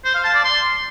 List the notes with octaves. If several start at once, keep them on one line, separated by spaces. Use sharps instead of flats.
C5
F5
A5
D5
C6